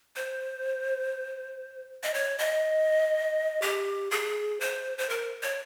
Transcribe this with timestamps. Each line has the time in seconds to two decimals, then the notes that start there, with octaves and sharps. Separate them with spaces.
0.16 C5
2.03 D#5
2.14 C#5
2.38 D#5
3.62 G4
4.11 G#4
4.60 C5
4.98 C5
5.10 A#4
5.43 C#5